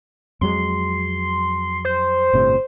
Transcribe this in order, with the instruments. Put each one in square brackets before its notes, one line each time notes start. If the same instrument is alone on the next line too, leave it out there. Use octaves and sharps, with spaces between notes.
[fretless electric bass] F2 F#3 G#3 [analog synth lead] C6
[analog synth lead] C5
[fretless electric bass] G1 A2 C3